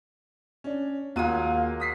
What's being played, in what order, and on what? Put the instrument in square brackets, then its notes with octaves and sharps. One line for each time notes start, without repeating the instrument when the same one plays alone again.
[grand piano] C#4 D4
[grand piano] D#2 F4 D#7 [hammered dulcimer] F#3 G#3 A#3
[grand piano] D#6 B6 C7